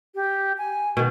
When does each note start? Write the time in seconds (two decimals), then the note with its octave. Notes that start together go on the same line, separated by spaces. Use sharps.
0.15 G4
0.58 G#5
0.97 B2 D#3